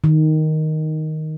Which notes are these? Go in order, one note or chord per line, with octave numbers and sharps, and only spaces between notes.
D#3